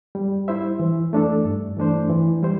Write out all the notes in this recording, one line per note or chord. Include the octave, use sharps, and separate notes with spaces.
G3
E4 C5 E5
E3
A3 D4 A4
G2
E3 A3 D4 C5
E3
G3 E4 C5